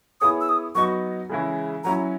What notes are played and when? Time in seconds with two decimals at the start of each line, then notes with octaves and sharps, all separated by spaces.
0.21 B3 E4 G#4 C#5 D#6
0.41 E6
0.49 D#6
0.75 F#3 B3 D#4 F#4 C#6
1.29 C#3 E3 G#3 C#4 E4
1.84 F#3 C#4 E4 A#5